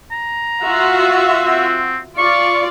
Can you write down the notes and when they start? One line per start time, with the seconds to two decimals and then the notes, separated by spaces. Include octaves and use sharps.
0.12 A#5
0.63 F4 F#4 E5
1.45 C4
2.18 F4 D5 C#6